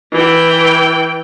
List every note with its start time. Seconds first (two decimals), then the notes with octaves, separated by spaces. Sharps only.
0.12 E3 G5